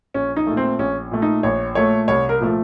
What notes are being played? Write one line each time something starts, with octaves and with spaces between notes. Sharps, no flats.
A#1 C#4
D#4
A#2 A3
C4
A#1 C#4
A#2 A3
D#4
A#1 C#5
A#2 A3 C#5
C2 C#5
A#4
A#2 F3 A3